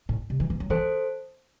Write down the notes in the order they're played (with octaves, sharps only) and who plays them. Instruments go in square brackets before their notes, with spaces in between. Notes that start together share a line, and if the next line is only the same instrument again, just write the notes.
[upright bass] A2
C3
E3
E3
F#3
[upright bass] E3 [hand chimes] A4 C5